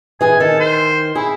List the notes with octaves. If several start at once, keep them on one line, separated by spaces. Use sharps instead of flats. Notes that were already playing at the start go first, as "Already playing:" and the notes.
E3 G#4 G#5
D#3 A4
C5
E4 G#4